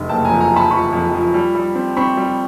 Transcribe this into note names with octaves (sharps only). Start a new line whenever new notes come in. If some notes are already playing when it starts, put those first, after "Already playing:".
Already playing: F1
F#1 G5 A5
F2 G#5 A#5
G#5 A#5
F3
A5 B5
F3 B5 C#6
F2
F3
G3
G3
C4
C4 B5 C#6
G3